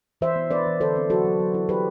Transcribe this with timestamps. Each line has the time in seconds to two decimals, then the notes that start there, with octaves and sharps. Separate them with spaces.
0.21 E3 C5 E5
0.36 B3
0.51 B3 B4 D5
0.66 E3
0.81 D3 A4 C5
0.96 C4
1.10 F#3 F#4 A4
1.24 F#3
1.40 F#3
1.54 E4
1.69 E4 G4 B4